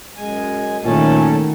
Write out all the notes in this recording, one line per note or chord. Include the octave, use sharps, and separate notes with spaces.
F#2 G#3 G#5
A#2 D#3 F#3 A3 C#4 A4 A5